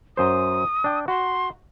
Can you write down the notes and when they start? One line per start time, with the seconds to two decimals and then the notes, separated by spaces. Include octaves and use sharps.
0.17 F#2 C5 D#6
0.84 D4 G5
1.08 F#4 C6